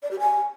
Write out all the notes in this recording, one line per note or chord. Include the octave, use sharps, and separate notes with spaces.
D5
G4
G#5